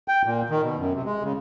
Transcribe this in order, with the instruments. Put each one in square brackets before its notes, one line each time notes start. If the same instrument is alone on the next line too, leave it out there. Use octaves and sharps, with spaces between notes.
[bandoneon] G5
A#2
D#3
B2
F#2
C3
G#3
C#3